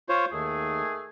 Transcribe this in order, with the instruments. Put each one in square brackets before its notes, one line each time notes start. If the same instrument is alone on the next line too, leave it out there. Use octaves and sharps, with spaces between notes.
[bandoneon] F4 C5 C#5
[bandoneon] D#2 [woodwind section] D#3 A3 G#4